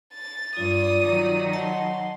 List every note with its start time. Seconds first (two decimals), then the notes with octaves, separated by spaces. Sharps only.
0.13 A6
0.57 G2 F4 D5 D#6
1.03 D#3 F#3
1.53 D#5 F#5 A5 C6